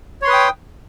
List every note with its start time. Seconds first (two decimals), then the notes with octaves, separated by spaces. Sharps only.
0.22 C#5
0.25 C6
0.27 B4
0.30 D#6
0.33 G5